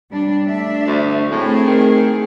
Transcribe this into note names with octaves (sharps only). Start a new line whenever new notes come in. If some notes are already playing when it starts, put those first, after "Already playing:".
G3 D4
A3 D4 E5
D2
A2 A3 C4 G#4
D#3